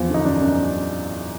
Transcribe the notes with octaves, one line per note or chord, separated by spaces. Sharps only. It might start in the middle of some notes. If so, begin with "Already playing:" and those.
Already playing: E2 F3
D3 D#4
F#2 D4
F#2